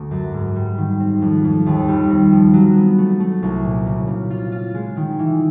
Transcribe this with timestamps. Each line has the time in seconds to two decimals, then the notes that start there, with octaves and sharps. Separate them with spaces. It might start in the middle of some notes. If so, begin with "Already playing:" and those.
Already playing: D2 A3
0.11 F#2
0.34 G#2
0.56 G3
0.78 D#3
1.00 C4
1.22 F2
1.44 F2
1.66 D#2
1.88 G3
2.09 C4
2.32 F3
2.54 F#3
2.76 B3
2.98 A3
3.20 A3
3.43 C2
3.64 A#2
3.86 C#3
4.08 C#3
4.30 F4
4.52 F4
4.74 G#3
4.96 D#3
5.19 E3